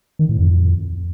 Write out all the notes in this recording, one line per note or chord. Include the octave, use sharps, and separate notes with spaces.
D#3
A2
F2